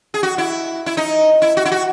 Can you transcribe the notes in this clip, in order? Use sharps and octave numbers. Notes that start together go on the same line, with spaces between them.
G#4
F#4
E4
E4
D#4
E4
F#4
E4
F#4